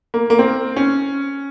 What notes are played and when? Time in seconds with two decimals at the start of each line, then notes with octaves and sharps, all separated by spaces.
0.14 A#3
0.30 A#3
0.39 C4
0.76 C#4